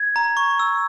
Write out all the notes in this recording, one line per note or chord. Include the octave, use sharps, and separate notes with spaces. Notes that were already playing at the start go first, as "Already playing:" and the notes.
Already playing: G#6
A#5
C#6
E6